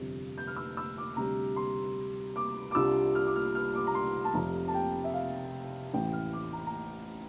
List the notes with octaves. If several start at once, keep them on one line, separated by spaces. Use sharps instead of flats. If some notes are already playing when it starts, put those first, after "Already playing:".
Already playing: G1 F2 C3
G6
F6
E6
E6
D6
D2 C3 G3 D4 A#5
C6
D6
D6
C2 C3 G3 D4 F4 E6
F6
D6
F6
F6
D6
A#5
C6
A5
F1 F2 C3 A#5
A5
G5
E5
F5
A1 A2 E3 G5
F6
D6
A#5
A#5